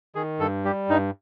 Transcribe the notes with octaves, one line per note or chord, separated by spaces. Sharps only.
D#3 G#4
G2 A4
G3 G4
G2 D#4